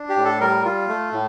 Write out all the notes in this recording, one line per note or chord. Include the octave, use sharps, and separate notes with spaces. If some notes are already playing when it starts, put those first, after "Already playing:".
Already playing: D4
G4
A2
A4
G3 A#4
F4
A3
A2